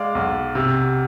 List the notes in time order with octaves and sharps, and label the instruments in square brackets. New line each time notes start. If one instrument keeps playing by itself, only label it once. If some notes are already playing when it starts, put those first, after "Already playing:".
Already playing: [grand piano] G#3 D5 F5
B1
C3